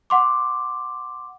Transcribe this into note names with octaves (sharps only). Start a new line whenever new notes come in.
F#5 C6 D6